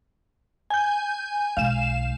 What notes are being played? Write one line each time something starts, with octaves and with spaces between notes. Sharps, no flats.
G#5 G6
B1 G#3 F5 E7